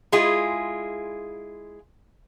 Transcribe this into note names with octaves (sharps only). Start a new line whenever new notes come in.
G#3 E4 F4 G#4